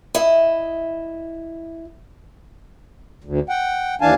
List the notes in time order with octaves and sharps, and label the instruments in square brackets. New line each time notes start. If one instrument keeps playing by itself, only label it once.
[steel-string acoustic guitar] E4 D#5
[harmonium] D2
F#5 G5
D#2 E3 D4 F5 G#5 A5